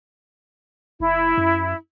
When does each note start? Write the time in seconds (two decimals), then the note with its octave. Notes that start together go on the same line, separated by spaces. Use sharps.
1.00 F#1 E4
1.37 F#2